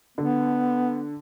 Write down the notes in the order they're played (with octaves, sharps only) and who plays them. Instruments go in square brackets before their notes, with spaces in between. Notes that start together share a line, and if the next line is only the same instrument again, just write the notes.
[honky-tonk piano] D3 [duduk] B3